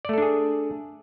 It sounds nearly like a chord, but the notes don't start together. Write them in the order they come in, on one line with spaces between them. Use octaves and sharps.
D5 A3 A4 D4 G#4